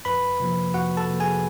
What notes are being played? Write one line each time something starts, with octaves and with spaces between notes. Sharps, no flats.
F2 B4 B5
C3 F3 A#3
F2 F#4 F#5
A4 A5
C3 F3 A#3
G#4 G#5